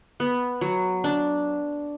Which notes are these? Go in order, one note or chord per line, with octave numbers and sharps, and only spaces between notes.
B3
F#3
D4